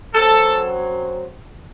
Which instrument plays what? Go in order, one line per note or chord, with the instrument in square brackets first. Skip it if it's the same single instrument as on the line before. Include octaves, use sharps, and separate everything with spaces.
[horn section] F#2 F#3 C4 A4